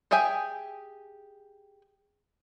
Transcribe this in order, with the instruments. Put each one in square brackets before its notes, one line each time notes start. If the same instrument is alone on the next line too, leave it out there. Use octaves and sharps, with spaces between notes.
[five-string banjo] G4 G#4 E5 G5 G#5